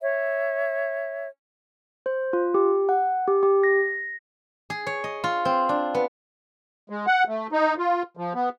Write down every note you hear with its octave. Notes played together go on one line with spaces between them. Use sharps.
C#5 E5
C5
F4
G4
F#5
G4
G4
A#6
G#4
C#5
D#5
F4
C4
D4
B3
G#3
F#5
A3
D#4
F4
F3
B3